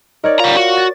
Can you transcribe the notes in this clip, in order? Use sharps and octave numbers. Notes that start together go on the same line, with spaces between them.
D#4 A#4 C#5 D5
G3 F4 A#5
F#4
A6